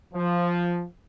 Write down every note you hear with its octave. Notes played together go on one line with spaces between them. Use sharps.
F3